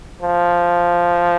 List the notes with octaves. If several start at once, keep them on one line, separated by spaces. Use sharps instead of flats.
F3